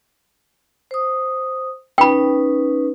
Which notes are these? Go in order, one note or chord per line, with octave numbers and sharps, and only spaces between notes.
C5 D#6
C#4 D#4 B4 G5 B5